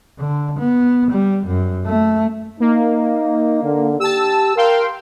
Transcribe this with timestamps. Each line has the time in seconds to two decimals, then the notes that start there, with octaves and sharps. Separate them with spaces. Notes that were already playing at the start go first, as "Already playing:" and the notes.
0.19 D3
0.59 B3
1.11 G3
1.46 F#2
1.86 A3
2.60 A#3 D#4
3.63 D3
4.00 G4 A5 E6
4.57 A#4 F5 G5 C6